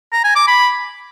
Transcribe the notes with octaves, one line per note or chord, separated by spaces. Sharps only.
A#5
G#5
D6
B5